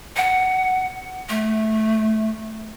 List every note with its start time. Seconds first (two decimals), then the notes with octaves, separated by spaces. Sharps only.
0.16 F#5
1.29 A3